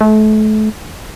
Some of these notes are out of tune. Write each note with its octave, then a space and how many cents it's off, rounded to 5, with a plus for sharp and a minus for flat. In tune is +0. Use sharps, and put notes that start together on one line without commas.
A3 -35